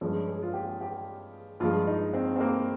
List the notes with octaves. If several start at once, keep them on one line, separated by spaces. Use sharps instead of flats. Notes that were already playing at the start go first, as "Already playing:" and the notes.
G2 F3 G#3 C#4
G#4
F4
G4
G4
G2 F3 G#3 F4
D#4
C4
C4
A#3